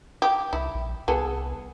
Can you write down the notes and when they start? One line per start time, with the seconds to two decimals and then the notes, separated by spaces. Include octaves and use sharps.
0.22 G4
0.53 C2 E4
0.75 A#1
1.08 C2 B3 G#4 A4